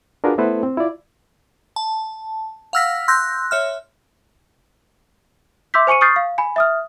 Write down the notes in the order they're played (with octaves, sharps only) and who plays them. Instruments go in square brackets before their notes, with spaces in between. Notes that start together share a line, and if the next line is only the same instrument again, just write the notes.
[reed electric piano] D4 F4 F#4 G#4 A#4 B4
A3 B3 E4 A4 B4 C5
C4
E4 F4 D5
[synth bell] A5
F5 F#5 E6 F6 A#6 B6
C6 E6 F#6 G6 A#6
C#5 E5 F6
[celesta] E5 C6 D6 E6 G6 B6
C5 G#5 C#6 C#7 D#7
C#6 D#6 F6 G6 A6 C7
F5
G#5 B5
E5 D#6 F6